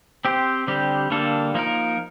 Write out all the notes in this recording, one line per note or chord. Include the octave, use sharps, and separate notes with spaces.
C4 G4 C5
D3 G3 C4 G4
D3 G3 A#3 D4 A4
F3 A#3 D#4 A#4